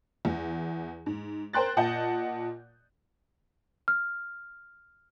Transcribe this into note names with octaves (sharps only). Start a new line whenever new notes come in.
E2
G#2
A#4 C5 G5 C6 F#6 A6
A#2 D#5 F#5 A5 G6
F6